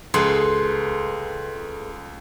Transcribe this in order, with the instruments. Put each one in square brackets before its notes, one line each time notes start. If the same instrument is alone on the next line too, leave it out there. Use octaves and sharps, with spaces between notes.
[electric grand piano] C#2 C6 [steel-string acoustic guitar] G#4 A4 B4